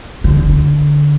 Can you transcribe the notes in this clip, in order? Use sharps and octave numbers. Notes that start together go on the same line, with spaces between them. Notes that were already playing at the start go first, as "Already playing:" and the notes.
D3